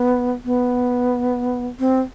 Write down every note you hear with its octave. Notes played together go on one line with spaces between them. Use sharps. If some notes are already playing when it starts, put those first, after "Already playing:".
Already playing: B3
B3
C4